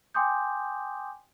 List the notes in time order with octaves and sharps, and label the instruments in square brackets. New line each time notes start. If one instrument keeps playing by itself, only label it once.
[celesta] G5 G#5 C6 D6 D#6 G6